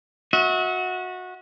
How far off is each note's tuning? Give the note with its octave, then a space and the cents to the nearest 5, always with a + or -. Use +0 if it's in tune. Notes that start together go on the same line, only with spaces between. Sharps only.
F#4 -20 E5 -40